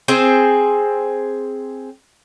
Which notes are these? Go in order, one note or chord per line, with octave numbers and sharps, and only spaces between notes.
C4 G#4 C5